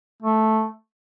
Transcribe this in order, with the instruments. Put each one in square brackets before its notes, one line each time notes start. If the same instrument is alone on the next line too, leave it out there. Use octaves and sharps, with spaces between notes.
[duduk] A3